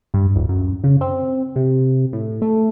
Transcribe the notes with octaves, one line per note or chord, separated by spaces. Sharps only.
G2
D1
F#2
C#3
C4
C3
A2
A3